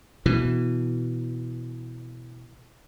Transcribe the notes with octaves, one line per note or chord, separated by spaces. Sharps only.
B2 E3